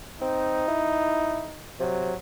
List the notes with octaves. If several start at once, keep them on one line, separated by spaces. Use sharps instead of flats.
C4 D#4
E4
C3 F#3